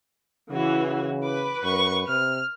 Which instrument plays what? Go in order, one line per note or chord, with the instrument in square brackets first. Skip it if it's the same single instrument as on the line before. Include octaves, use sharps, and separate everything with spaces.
[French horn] C#3 [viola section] E3 [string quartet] F#4
[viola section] B4 [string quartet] D6
[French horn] F#2 [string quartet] C#6
[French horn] C3 [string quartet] F6